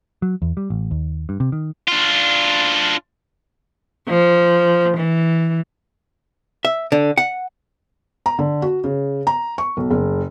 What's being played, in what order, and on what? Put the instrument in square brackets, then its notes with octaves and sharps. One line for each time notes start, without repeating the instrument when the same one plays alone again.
[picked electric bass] F#3
E2
G3
A1
D#2
G2
C3
D#3
[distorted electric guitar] D4 F4
[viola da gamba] F3
E3
[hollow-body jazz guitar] E5
D3
F#5
[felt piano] A#5
D3
F#4
C#3
A#5
C#6
B1
F#1